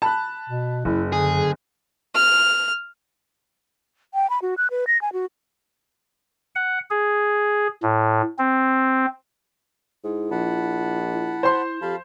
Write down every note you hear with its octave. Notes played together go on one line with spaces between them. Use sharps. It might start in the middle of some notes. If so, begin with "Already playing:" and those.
A5 B5 F#6
B2
F#1 F#2 E4
D3 G#4
F6
G5
B5
F#4
F#6
B4
A#6
G#5
F#4
F#5
G#4
A2
C4
G#2 E4
A#1 F#5 A5 B5
E4
C5 C6
F2 G4 F5 A5 B5